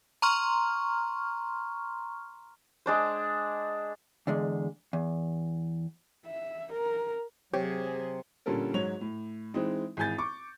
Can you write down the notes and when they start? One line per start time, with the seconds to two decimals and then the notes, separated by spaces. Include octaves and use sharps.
0.22 A#5 C6 C#6 F6
2.86 G#3 D4 C5
4.27 E2 D3 G#3
4.93 E2
6.26 E5
6.73 A#4
7.54 C3 F#3 G4 G#4 C#5
8.46 A#2 D3 G3 C#4 A4 A#4
8.74 G#2 F#3 C#5 F7
9.01 A2
9.54 E3 G#3 C4 D#4
9.97 G#1 E3 G#4 G#5 G6 A6
10.18 C#6 D6